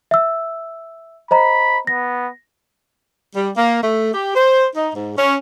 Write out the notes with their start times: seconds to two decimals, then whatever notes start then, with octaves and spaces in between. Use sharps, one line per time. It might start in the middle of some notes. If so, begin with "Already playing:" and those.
0.11 E5 E6
1.31 C5 D#5 A#5 B5
1.87 B3 A#6
3.35 G3
3.57 A#3
3.83 A3
4.14 G4
4.35 C5
4.76 D#4
4.95 G#2
5.18 C#4